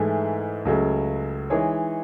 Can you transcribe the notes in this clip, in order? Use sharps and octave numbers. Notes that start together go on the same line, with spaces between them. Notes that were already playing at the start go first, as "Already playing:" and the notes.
Already playing: G#2 E3 A3 E4 G#4
C#2 C#3 F#3 A3
E3 G#3 D#4 G#4 C#5